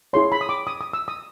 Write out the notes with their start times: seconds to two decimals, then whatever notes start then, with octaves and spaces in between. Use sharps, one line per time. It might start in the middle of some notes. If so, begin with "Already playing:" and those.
0.13 E4 G#4 C#5 C6
0.32 B5
0.41 D#6
0.49 D6
0.67 D#6
0.81 D#6
0.93 E6
1.08 D#6